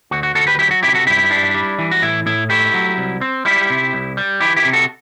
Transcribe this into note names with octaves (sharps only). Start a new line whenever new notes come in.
D2 F#4
F#4
D2 F#4 A4
G4 B4
F#3 E4 G4
F#4
C3 E4 G4
F#4 A4
G2 E4 G4
D4
G3
E3
F#4
A2 E4
A2 E4
A3 E4 G4
F#3
C2
C4
G3 E4 G4
C3
C2
G3
E3 E4 G4
E4 G4
C3
F#4 A4